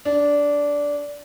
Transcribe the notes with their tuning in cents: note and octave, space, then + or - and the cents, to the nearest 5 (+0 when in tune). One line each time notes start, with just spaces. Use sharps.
D4 -15